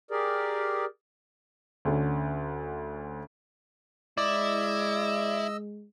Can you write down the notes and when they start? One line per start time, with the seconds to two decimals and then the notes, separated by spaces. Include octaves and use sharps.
0.11 G4 G#4 A#4 D5
1.85 D2 D3 C#4
4.18 G#3 E4 D5 D#5 E6